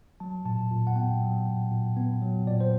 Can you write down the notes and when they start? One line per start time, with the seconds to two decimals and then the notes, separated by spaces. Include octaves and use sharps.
0.20 F#3 A5
0.45 A#2 A5
0.71 A#2
0.87 F#5
0.96 B3 G5
1.21 F#3
1.46 A#2
1.71 A#2
1.96 B3
2.22 F#3
2.47 A#2 D5
2.60 C5